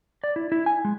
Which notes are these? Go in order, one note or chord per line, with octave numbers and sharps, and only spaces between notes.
D5
E4
E4
G#5
G#3